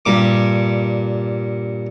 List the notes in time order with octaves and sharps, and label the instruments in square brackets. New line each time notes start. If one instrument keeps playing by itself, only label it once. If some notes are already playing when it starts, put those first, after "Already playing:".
[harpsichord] G2 A#2 D6